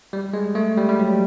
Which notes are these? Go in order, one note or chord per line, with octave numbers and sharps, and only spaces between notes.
G3
G#3
A3
G3
G3
F#3